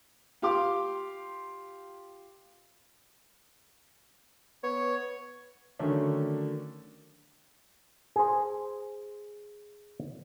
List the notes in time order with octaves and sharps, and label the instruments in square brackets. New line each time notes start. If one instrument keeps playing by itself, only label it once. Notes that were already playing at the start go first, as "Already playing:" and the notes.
[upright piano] F4 G4 F5 C6 D6
[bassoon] B3 [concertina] C#5
[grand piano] D3 D#3 F#3 A3 C#4 D4
[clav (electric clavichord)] G#4 C5